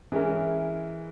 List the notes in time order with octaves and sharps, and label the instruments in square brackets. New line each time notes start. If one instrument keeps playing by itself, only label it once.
[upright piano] E3 G#3 C#4 E4 A#4